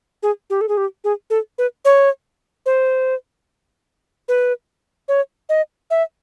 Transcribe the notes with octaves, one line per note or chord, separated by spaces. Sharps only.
G#4
G4
A4
G#4
G4
G#4
A4
B4
C#5
C5
B4
C#5
D#5
E5